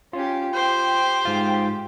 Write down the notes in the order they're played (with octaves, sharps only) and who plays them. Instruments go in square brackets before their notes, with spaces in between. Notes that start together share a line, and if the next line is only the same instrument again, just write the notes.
[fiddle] C#4 G4 [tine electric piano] F4
[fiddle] G4 G5 [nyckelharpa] C5
[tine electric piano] G#2 F4